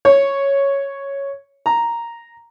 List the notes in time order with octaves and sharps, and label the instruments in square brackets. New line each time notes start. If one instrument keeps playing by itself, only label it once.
[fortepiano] C#5
A#5